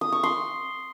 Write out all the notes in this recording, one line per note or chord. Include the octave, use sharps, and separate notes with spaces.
D#6
C#6
C6